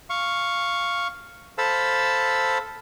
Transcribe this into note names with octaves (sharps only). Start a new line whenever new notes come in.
F5 C#6
A4 C5 F5 A5 B5 E6